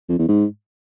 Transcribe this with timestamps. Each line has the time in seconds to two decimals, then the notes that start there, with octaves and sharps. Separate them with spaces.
0.09 F2
0.19 E2
0.28 G#2